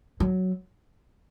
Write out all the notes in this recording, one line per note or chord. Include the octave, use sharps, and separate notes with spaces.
F#3